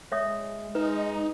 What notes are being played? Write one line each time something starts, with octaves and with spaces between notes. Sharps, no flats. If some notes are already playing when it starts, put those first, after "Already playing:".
G#3 C#5 E5 D#6
G#3 D#4 B4